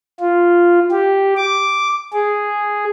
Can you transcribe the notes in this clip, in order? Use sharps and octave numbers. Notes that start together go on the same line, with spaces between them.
F4
G4
D6
G#4